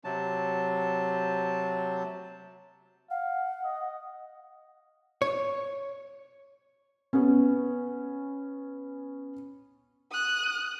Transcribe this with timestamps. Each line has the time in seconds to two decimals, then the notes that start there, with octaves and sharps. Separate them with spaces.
0.04 C3 F#3 A5
3.10 F5 F#5
3.64 D#5
5.22 C#5
7.13 B3 C#4
10.11 D#6 F#6